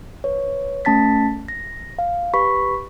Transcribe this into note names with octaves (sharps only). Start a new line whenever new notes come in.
B4 C#5
A3 C#4 A5 A6 B6
A#6
F5
G4 B4 B5 C#6 B6